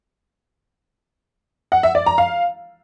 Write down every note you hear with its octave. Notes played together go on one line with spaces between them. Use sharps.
F#5
E5
D5
A#5
F5